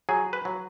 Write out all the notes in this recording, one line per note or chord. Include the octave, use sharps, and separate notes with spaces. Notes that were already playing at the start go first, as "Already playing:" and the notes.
F#3 G#4
B4
F#3